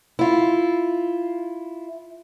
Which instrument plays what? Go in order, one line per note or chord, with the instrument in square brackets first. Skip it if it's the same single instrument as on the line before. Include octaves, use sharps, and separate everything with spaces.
[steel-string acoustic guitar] E4 F4